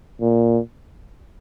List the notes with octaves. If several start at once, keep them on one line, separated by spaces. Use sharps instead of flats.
A#2